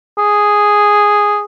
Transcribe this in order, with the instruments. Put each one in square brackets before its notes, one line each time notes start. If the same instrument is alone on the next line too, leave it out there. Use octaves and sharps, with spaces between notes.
[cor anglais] G#4